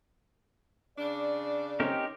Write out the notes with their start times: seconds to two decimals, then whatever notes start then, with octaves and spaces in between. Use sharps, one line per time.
0.98 C#3 D4 D5
1.80 C4 C#4 D#4 G4 A#4